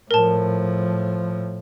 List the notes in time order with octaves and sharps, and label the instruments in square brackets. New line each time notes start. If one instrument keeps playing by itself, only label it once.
[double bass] A2 F3 [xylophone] A#4 A5